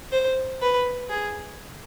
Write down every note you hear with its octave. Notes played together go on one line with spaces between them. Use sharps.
C5
B4
G#4